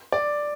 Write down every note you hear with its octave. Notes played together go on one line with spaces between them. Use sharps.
D5